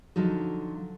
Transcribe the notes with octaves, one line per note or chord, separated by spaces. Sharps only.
D3 F3 F#3 D#4 A4